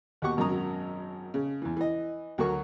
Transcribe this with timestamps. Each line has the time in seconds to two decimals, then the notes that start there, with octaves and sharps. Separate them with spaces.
0.22 D#2 B2 G4 F#5 C#6
0.37 G#1 F#2 B2 F#3 A#5 D#6
1.34 C#3
1.62 E2 E3
1.77 E3 D#5
2.38 D2 F#3 F#4 A#4 C#6